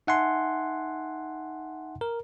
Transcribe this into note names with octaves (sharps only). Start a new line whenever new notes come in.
D#4 E5 F#5 G#5 A5 C6
A#4